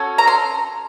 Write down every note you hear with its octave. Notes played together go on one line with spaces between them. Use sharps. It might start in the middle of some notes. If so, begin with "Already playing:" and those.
Already playing: C#4 F#4 A4
A#5
C6